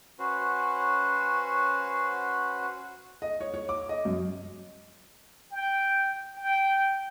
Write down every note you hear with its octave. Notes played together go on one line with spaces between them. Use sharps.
C#4 F#4 B4 C5
D#5
C#5
C#5
D6
D#5
F#2
G5
G5